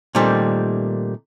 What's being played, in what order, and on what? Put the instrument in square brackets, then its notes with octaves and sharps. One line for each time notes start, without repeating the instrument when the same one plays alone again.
[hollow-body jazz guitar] A#2 D#3 G3 A3 C4